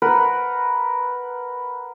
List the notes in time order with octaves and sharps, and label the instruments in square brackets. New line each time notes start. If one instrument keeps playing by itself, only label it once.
[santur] A#4 B4 F#5